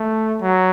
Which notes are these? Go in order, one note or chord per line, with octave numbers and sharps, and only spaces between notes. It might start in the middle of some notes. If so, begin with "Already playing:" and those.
Already playing: A3
F#3